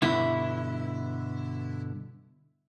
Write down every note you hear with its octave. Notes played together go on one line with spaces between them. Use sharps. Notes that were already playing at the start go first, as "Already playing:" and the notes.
G2 B2 D3 E4